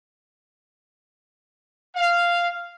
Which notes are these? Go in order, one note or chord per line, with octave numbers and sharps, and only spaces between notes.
F5